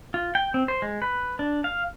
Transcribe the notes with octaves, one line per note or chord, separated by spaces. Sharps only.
F4
G5
C4
C5
G#3
B4
D4
F5